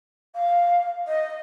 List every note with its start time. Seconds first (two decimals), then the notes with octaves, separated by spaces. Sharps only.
0.35 F5
1.07 D#5